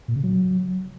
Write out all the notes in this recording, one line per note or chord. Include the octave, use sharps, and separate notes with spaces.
A#2
C#3
F#3